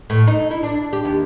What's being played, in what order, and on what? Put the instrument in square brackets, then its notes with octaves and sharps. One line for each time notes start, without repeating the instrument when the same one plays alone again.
[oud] A2
D#4
E4
D4
G4
D#2